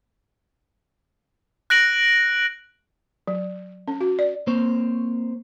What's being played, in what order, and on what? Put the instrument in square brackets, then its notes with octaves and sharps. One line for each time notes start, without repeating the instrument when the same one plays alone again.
[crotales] F#6 A#6 D7 F#7
[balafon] F#3
C#4
F#4
D5
[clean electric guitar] A#3 C4 C5 C#5